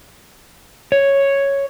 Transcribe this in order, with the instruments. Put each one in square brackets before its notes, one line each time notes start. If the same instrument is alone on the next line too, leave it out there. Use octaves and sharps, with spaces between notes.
[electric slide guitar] C#5